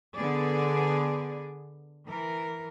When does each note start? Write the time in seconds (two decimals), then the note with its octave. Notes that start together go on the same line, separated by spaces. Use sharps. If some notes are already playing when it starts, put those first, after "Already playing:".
0.15 D3 B3 G#4 D5
2.06 E3 A#4